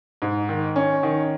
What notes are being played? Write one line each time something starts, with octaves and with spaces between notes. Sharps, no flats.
G#2
D#3
C#4
D#3